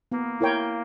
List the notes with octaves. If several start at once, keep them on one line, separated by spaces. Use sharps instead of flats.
A#3 B3
E4 A#4 C#5 G5